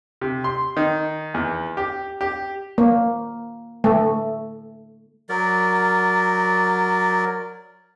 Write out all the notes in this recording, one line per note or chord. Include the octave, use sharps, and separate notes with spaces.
C3
C6
D#3
E2
G4
G4
A#3
A3
F#3 A#4 D5